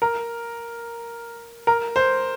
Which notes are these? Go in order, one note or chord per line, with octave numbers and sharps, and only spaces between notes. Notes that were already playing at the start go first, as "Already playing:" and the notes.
A#4
A#4
C5